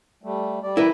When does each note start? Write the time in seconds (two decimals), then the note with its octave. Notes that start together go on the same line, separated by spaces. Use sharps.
0.23 G3 A3
0.63 G3 D5
0.77 E4 A#4 B4